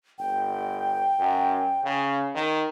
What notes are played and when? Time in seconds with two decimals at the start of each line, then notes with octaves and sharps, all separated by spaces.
0.19 G1 G5
1.19 F#2
1.84 C#3
2.35 D#3